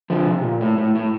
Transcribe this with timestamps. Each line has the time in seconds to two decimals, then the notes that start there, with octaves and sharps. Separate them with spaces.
0.10 D3 F3
0.27 C3
0.44 A#2
0.61 A2
0.78 A2
0.95 A2